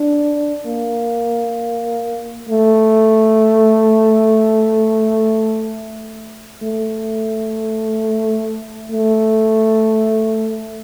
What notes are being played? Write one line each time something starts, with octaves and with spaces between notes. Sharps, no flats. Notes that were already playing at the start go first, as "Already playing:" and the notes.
Already playing: D4
A#3
A3
A3
A3